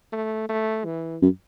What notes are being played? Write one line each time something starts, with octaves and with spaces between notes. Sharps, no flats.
A3
A3
E3
F#2